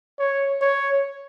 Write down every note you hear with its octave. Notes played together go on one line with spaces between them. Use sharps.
C#5
C#5